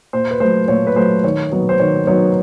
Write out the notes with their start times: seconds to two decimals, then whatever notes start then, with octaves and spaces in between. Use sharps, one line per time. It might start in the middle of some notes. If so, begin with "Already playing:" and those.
0.13 A#2 C5
0.31 B4
0.40 F#3 A3 C5
0.68 A#2 C#5
0.87 B4
0.96 F#3 A3 C5
1.24 D#3 C#5
1.51 F#3 B3 D#4
1.69 C5
1.79 D#3 C#5
2.07 F#3 B3 D#4 C#5